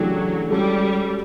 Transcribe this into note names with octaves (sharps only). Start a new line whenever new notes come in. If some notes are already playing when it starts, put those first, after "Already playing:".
Already playing: C#3 E3 F#3 A3 D4 G4
G3 G#3 C#4 F#4 A4